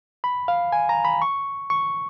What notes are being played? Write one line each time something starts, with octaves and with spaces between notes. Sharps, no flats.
B5
F5
G#5
A#5
B5
C#6
C#6